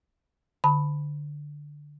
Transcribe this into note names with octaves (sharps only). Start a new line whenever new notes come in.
D3 A5 B5